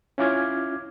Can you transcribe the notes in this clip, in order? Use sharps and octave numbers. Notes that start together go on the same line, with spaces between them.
C#4 E4 F4 D6 F6 G#6